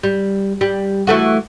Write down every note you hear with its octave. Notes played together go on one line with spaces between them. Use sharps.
G3
G3
E3 A3 F#4